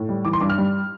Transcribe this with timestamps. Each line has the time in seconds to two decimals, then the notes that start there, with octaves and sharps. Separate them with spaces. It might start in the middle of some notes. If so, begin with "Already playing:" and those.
Already playing: A2
0.09 G3
0.25 E3 D6
0.33 C6
0.41 G2 D6
0.50 F6
0.58 G3